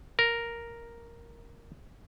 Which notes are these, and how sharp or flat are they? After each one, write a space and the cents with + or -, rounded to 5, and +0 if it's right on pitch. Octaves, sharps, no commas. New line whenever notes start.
A#4 +0